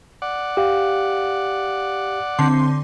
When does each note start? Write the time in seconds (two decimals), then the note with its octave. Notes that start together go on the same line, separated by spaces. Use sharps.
0.22 D5 F#5
0.57 G4 F5
2.39 D3 C4 C6